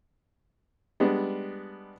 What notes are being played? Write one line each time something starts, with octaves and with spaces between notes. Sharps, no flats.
G3 G#3 B3 D4